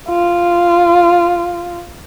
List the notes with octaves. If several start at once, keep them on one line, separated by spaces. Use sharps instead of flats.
F4